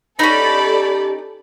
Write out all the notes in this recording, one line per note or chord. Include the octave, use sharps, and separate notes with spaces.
G3 C#4 D#4 G4 A4 D5 B5